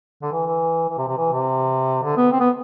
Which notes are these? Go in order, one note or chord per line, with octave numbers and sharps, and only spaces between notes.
D3
E3
E3
E3
C3
C3
E3
C3
D3
B3
C4
B3